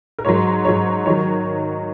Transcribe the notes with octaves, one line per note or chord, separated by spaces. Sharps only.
A#4
G#2 F#3 C#5
G#2 F#3 C#5
D#3 F#3 C#5